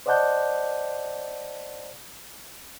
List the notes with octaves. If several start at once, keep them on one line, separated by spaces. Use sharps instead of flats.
C5 D5 D#5 F#5 A5 G6